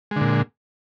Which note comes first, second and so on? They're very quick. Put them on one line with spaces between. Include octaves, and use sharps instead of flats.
G#3 D3 A#2